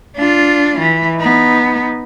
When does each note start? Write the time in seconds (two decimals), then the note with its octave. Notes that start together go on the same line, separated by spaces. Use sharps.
0.16 D4 F4
0.79 E3
1.16 B3 D#4